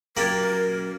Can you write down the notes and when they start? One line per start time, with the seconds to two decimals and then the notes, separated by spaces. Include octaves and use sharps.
0.17 F#2 A#3 G4 A#4 G#6 A6 F#7